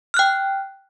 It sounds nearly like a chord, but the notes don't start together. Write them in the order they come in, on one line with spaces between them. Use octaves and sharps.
F6 F#6 G5